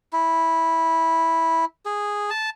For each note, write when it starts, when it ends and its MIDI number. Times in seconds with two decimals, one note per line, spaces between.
0.13 1.65 64
1.85 2.30 68
2.30 2.50 81